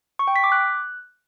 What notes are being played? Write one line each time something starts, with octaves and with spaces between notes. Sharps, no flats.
C#6
G5
B6
D6
F#6